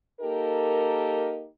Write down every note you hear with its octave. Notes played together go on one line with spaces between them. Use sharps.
A#3 D#4 G4 A4 A#4